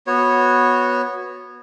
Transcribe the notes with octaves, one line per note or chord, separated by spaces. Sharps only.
B3 F#4 C#5